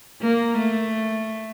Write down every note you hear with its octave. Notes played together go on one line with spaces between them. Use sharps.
A#3
A3